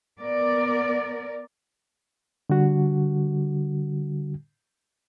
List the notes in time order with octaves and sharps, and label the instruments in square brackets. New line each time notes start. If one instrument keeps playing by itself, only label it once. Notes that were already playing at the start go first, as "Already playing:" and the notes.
[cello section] B3 A#4 D5
[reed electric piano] D3 G3 F#4